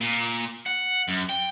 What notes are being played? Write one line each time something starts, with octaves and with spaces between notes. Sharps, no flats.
A#2
F#5
F#2
G5